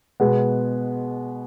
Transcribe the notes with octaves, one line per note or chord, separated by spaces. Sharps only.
B2 G#3 B3